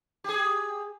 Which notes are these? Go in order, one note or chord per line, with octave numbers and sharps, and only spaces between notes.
G4 G#4